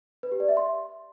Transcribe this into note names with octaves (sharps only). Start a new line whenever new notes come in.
B4
G4
D5
E5
C6